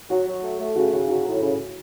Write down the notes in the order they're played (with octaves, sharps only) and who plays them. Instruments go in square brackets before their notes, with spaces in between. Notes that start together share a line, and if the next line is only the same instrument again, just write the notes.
[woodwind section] F#3 [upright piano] F#4
[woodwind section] F#3
A3
A3
[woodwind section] C#3 [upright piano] F#4
[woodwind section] C#3 [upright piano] F#4
[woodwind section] F#3 [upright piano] F#4
[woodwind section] A2
C#3